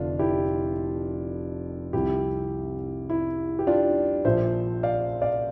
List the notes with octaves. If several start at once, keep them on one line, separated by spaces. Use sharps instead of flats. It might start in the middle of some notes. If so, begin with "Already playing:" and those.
Already playing: F1 F2 D3 F3 D4 F4
E4 G4
C2 C3 F3 E4 G4
E4
G4
D4 F4
A#1 A#2 F3 C5 E5
D5 F5
D5 F5